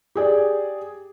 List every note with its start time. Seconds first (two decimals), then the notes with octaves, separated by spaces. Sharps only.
0.15 G4 G#4 D5